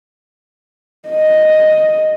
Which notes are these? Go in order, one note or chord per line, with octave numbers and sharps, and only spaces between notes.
D#5